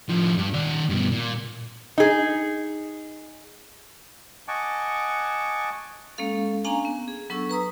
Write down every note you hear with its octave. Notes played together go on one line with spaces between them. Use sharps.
A2 F3
G2
D#3 D5
G2 B2
A#2
D#4 G#4
D#5 F#5 G#5 A5 C#6 D6
G#3 A#3 C#4 A4 F5
A#3 C#4 D4 F5 G#5 A#5
B3
G#4
F#3 B3 D4 A4 C#6 E6
B4 A#5 D#6